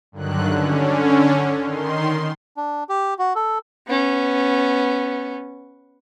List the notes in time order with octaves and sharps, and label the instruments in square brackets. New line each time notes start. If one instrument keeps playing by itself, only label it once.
[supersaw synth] G2 D3 D#3 F#3 F#6
D3 C#4
D#3 C6
[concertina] D4
G4
F#4
A4
[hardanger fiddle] B3 C#4